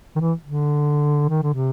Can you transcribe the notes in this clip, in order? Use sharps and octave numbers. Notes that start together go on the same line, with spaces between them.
D#3
E3
D3
D#3
D3
C3